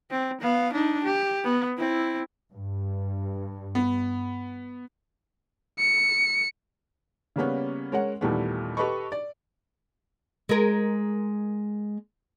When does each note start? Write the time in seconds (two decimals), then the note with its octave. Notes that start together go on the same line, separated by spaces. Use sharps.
0.11 C4
0.41 B3 F5
0.73 D4 D#4
1.04 G4
1.44 B3
1.78 C4 E4
2.52 G2
3.75 B3
5.79 C#7
7.36 C#3 G3 A#3 B3 C#4
7.92 G#3 C#4 A#4 C#5 F#5
8.21 D#2 A#2 E3 G3 A3 B3
8.77 G4 A4 B4 D#5 C#6
9.12 D5
10.49 G#3 A#4